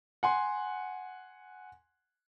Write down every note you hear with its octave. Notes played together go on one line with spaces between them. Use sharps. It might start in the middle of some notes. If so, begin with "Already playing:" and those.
F#5 G#5 C6